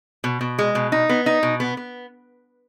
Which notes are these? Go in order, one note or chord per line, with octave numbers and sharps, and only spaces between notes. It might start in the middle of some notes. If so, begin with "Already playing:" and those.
B2
B2
G#3
B2
D#4
B3
D#4
B2
B3
B3